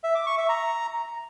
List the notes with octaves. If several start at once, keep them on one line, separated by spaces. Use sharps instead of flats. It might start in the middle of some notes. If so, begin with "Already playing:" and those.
E5
D6
C#6
E5
A#5